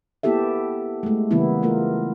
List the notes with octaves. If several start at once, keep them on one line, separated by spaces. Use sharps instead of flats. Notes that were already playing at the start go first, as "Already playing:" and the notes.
A#3 B3 E4 G4 A4 E5
G#3 A3
C#3 E3 G3 A#3 B3 E4
A3 A#3 F4 A#4